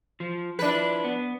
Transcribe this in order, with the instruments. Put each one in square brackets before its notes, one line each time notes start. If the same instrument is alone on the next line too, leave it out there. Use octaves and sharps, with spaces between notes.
[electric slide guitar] F3
[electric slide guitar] F3 E4 [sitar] D4 B4
[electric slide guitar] B3